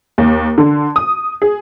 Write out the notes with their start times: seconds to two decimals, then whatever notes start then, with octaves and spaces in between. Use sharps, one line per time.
0.18 D#2
0.58 D3
0.96 D#6
1.42 G#4